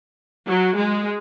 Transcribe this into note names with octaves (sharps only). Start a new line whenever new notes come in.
F#3
G#3